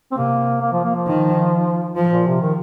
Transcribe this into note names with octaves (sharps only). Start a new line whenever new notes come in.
C4
C3 A#3
A#3
F3
A#3
F3
D#3
F3
A#2
C3
D#3